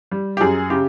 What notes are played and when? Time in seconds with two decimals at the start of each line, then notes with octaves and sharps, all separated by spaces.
0.11 G3
0.37 G4
0.41 F#2 G#4
0.70 C#3 G4